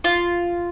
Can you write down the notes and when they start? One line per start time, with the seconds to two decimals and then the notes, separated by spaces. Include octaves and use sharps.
0.04 F4